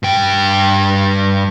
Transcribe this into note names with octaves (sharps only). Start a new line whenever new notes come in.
G2 G5